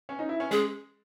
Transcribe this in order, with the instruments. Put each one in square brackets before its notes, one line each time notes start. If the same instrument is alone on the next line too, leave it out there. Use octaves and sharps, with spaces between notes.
[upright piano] C#4
D#4
E4
C#4
[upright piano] G#3 [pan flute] G#4